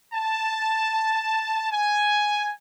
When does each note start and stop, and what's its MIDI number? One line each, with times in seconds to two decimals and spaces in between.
0.14 1.70 81
1.72 2.51 80